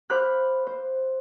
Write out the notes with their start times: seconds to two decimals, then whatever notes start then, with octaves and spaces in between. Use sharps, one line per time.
0.10 C5 F5 B5 D6 F#6
0.67 C5